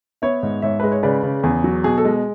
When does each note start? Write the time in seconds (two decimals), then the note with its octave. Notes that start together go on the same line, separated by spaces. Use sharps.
0.22 B3 C#5 E5
0.43 G#2
0.62 G#2 C#5 E5
0.80 G#3 B4
0.92 C#5
1.03 C#3 B4 D5
1.23 C#3
1.43 E2 G#4
1.64 F#3
1.84 B2 G#4
1.98 A4
2.05 G#3